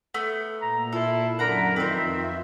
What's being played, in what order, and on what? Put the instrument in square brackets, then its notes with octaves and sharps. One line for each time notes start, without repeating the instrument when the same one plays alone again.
[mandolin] A3 B3
[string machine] A#2 [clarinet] A#5
[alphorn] E4 [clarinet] F4 [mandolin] A4
[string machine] F#2 [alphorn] D3 [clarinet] A#4 [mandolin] F#5 A#5 B5
[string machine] F2 F4 E5 [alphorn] D#3 [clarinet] C4 [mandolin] B4 C5